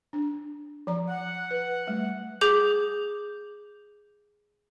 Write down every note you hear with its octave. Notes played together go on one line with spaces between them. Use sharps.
D4
F3 D5 A#5
F#5
B4
G3 A3
G#4 D6 G6 F#7